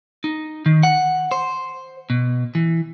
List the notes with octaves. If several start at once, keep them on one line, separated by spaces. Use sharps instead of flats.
D#4
D#3
F#5
C5
B2
E3